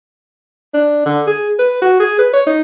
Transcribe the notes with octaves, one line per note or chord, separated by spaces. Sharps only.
D4
D3
G#4
B4
F#4
G#4
B4
C#5
D#4